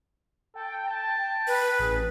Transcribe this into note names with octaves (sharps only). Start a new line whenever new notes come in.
A4 G5
A5
B4
A1 G#4